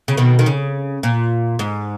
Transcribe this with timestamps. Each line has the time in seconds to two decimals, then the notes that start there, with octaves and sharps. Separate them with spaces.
0.08 C#3
0.17 B2 D#3
0.39 D#3
0.46 C#3
1.03 A#2
1.59 G#2